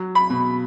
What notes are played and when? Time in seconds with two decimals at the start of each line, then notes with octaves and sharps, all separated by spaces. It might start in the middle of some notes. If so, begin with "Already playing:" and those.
Already playing: F#3
0.15 B5
0.30 B2